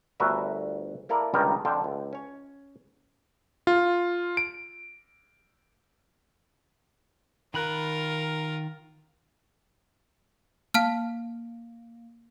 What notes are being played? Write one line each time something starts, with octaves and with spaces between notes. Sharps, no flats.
G1 D2 F#4 A#4 B4 E5
A#3 E4 A4 A#4 D5
C#2 G2 D3 D#3 G3 A#4
F2 D3 C5 F5 G5 A5
C#2
C#4 C#5
F4
D7
D#3 F4 A#4 B5 F#6
A#3 F5 A5 F6